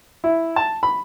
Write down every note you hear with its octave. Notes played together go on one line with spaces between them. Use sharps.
E4
A5
B5